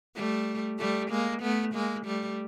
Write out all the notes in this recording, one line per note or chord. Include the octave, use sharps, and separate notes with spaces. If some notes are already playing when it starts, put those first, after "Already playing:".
G3 A3
G3 A3
G#3 A#3
A3 B3
G#3 A#3
G3 A3